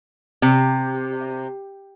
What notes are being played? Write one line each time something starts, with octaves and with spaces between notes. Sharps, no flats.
C3